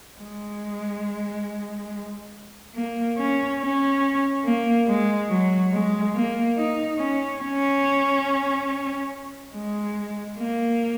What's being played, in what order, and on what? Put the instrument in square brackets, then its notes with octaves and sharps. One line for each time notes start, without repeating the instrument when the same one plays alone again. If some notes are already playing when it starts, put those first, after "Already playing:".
[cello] G#3
A#3
C#4
C#4
A#3
G#3
F#3
G#3
A#3
D#4
C#4
C#4
G#3
A#3